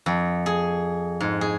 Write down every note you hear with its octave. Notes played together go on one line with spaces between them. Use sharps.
F2
G#4
G#2
G#4